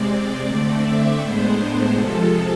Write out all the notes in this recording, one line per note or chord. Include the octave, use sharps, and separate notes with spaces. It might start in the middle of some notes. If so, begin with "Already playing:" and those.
Already playing: C3 G#3 C4 D5
D3 A3 C4 D5
E5
A2 G#3 B3 D4 C5
C3 F3 G#3 A4